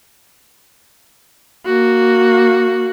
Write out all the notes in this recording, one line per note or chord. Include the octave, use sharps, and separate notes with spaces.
A#3 F#4